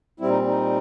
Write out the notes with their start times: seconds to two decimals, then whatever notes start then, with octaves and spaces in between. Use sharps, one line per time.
0.20 A#2 G3 C4 E4
0.29 D#4
0.47 D#4